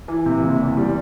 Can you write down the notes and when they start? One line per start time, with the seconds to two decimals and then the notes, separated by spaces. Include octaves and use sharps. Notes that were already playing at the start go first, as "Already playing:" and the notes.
0.08 E3
0.26 C3
0.43 F#1
0.61 E2
0.77 G3